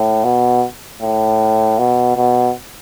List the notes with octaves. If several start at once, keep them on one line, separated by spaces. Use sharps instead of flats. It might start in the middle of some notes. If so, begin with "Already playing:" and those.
Already playing: A2
B2
A2
B2
B2